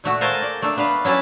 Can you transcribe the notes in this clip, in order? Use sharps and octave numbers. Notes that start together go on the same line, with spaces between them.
A#2 A3 F#4
A4 A#4 C5 F5 G#5 A5
D5
A3 A#3 D4 A4
B3 D4 B4 F5
F#3 C#4 E4 B4 A5